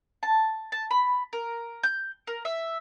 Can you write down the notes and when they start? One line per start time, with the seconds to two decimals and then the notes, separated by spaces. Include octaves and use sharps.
0.23 A5
0.72 A5
0.91 B5
1.33 A#4
1.83 G6
2.27 A#4
2.45 E5